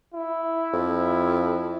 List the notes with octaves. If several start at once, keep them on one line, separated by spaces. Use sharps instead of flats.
E4
F2